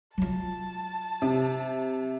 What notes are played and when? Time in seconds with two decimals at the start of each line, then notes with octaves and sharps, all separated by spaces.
0.18 F#3 F4 A5
1.22 C3